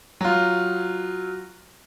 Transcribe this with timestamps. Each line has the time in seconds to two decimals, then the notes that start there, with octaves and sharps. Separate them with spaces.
0.21 F#3 F4